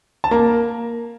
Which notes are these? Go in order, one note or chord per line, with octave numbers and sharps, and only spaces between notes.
A5
A#3 A#5